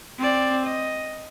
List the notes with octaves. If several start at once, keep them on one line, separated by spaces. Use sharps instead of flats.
C4 D5
D#5